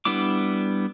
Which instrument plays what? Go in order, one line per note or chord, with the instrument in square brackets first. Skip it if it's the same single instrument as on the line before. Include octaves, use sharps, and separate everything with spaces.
[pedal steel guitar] G3 B3 D4 E4 D6